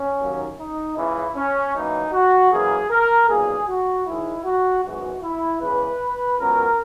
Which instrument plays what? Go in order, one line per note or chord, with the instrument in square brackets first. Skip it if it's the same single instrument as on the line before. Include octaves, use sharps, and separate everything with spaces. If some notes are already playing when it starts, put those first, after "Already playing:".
Already playing: [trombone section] C#4
D#2 D#3 F#3 A#3
D#4
C#2 C#3 E3 E4
C#4
F#2 E3 A#3 D#4
F#4
F#2 E3 A#3 G#4
A#4
B1 A#2 A#3 G#4
F#4
G#2 D#3 G#3 E4
F#4
G#1 F#2 E3 G#3 B3 F#4
E4
E2 C#3 E3 G#3 B4
C#2 C#3 F#3 B3 A#4